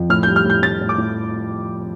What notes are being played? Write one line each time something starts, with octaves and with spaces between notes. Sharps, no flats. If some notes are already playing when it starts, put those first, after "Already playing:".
Already playing: F2
A2 F6
G3 G6
F6
A2 G6
A2 A6
A2
D6
A2